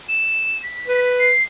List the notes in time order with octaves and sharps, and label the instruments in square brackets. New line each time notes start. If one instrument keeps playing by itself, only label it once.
[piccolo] E7
B6
[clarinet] B4
[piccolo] C7